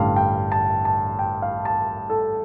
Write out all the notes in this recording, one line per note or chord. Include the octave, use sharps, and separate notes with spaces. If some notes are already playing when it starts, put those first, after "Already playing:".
Already playing: A1 G2 D3 G3 F5
G5
A5
A5
G5
F5
A5
A4